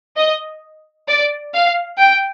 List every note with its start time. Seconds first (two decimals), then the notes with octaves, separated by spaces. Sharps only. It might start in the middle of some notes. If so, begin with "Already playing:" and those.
0.17 D#5
1.08 D5
1.54 F5
1.99 G5